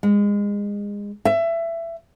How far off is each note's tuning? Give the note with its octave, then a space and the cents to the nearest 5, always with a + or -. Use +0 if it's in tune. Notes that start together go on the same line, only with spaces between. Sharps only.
G#3 -25
E5 +20